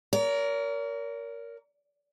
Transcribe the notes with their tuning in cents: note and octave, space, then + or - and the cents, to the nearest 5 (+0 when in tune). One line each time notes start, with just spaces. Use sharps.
A#4 +0 C#5 +45